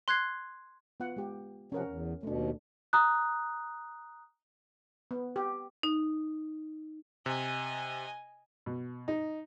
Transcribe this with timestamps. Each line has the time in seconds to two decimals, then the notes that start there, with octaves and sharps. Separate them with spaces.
0.08 C6 F#6 G#6 C7
1.00 B3 F4 F#5
1.17 G#3 G4
1.72 C3 F3 C#4 A#4 F#5
1.84 E2
2.23 D#2 B2 A3 D4
2.93 A#5 D#6 F#6
5.11 B3
5.36 G4
5.83 D#4
7.26 C3 D#5 G#5
8.66 B2
9.08 D#4